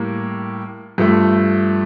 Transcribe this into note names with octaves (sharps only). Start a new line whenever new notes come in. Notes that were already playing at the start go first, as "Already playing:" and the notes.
Already playing: A2 G3 A#3
G2 F3 A3